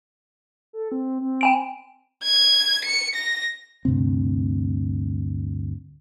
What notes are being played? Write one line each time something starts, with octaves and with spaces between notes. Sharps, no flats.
A4
C4
C4
G5 G#5 D7
G#6
C#7
A#6
D2 G2 C3 C4